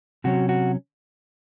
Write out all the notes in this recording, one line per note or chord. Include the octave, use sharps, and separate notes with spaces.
C3 F#3 C#4 F#4
F#4